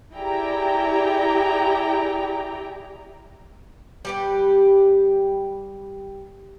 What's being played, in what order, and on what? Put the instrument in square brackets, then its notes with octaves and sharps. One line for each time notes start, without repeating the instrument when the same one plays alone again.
[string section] E4 G4 G#4 D5 G5 A#5
[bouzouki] G3 G4 B4